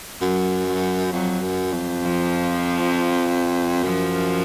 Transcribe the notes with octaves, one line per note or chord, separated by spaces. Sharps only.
F#2 F#3
F#3
F2 F#3
F#2
F2
F3
F#2 F3